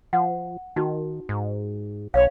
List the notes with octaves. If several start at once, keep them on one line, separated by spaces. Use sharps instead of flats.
F3 F#5
D#3 D#4 F#4
G#2
B1 C#5 F5